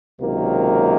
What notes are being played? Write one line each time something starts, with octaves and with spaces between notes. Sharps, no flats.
C#2 C3 D#3 F#3 A#3